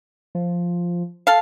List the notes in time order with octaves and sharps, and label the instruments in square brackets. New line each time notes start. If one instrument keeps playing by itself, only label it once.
[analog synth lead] F3
[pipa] A4 F5